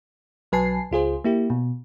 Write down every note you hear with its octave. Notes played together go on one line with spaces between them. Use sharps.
B1 F#3 B4 G#5 A5 C7
C#2 F4 G#4 C5
A#3 E4 G4
B2